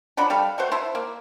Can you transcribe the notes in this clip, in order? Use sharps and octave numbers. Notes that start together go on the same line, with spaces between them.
F3 F#3 D4 B5
G3 A4 F5
A3 F#4 C5
E4 C5 E5 A5
A#3